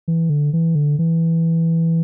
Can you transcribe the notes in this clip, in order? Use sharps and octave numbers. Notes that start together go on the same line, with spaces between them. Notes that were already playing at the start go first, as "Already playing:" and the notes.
E3
D3
E3
D3
E3